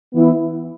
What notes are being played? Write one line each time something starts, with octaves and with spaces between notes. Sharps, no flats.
E3 B3 E4